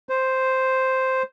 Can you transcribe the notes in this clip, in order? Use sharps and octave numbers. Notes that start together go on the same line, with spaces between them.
C5